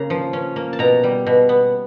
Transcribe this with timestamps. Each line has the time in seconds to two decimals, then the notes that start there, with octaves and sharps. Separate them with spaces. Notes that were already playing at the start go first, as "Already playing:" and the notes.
Already playing: C#3 A#3 C#4 A#5
0.10 F3
0.33 C#4
0.56 A#3
0.73 A5
0.79 B2 A#5
1.03 G3
1.26 B2
1.49 B3